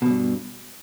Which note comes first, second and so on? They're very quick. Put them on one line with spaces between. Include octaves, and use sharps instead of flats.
B2 E2 G2